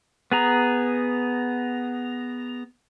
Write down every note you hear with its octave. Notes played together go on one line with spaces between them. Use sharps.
B3 G#4 A#5